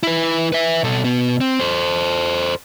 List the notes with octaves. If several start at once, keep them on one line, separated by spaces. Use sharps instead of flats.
E4 B4
B4 E5
B2 A4
B2 B3
C4
A4 C5